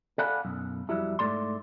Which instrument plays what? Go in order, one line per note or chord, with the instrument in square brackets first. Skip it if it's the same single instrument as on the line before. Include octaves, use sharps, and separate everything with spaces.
[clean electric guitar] A4 D5 F5 F#5 G#5 B5
B1 F#2
F2 F#3 G3 E4
G#2 D#3 A3 D5 C6